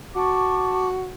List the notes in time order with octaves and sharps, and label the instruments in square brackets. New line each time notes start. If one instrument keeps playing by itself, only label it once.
[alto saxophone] F#4 [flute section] A5 C#6 D6